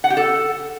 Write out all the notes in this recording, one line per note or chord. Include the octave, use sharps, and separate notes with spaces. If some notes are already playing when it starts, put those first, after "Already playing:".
F#5
G4
A4